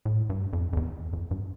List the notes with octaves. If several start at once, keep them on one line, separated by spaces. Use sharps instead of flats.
A2
G2
F2
F2
E2
F2
G2